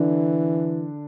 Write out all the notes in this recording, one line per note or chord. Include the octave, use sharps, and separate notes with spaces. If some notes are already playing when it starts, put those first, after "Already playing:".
Already playing: D3 E3 D4